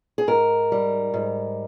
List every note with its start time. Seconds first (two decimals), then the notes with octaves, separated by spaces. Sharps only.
0.18 G#4
0.27 G#2 A#4
0.72 G3
1.14 G#2